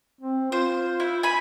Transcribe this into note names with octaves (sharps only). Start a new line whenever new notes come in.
C4
F4 C5
E4
G#5 B5